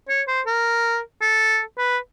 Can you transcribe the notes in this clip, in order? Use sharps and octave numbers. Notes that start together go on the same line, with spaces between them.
C#5
C5
A#4
A4
B4